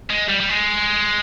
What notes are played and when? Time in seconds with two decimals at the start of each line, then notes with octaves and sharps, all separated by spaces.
0.10 G#3
0.29 G3
0.41 G3
0.49 G#3